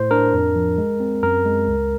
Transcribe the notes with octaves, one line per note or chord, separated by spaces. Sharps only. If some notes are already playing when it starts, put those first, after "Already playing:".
Already playing: A2 C5
D4 A#4
F2
F3
G#3
C4
F#2 A#4
G#3
C#2